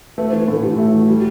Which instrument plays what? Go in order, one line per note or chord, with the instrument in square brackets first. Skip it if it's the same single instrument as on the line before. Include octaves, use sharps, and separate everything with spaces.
[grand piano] A3 [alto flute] B4
[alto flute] C5
[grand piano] E3
[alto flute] B4
[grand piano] A2 [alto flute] A4
[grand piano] A2 [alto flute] G4
[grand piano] A3
[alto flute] F#4
[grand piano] E3
G3